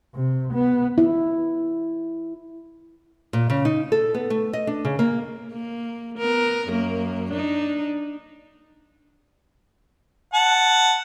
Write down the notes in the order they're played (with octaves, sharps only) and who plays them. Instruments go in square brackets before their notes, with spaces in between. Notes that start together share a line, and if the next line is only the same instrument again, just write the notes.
[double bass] C3
B3
[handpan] E4
[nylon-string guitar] A#2
C#3
D#4
A4
B3
A3
D#5
D4
C#3
A#3
[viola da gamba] A#3
B3 A#4
F#2 A#3
D4 D#4
[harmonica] F#5 A5